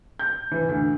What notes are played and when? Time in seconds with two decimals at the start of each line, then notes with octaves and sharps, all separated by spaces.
0.19 G6
0.52 E3
0.69 D2